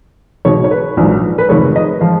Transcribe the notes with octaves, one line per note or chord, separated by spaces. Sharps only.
B1 B2 G#3 C#5
C#5
B4
A#1 G#2 F#3
B4
F1 F2 D#3 G#3 C#5
D#5
F3 G#3 F5